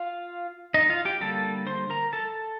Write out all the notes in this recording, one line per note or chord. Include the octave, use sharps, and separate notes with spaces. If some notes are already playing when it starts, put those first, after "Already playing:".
Already playing: F4 F5
D#4 D#5
F4 F5
G4 G5
D3 G3 A#3 A4 A5
C5 C6
A#4 A#5
A4 A5